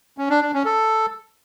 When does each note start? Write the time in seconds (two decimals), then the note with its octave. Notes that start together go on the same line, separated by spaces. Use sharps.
0.18 C#4
0.30 D4
0.42 D4
0.54 C#4
0.65 A4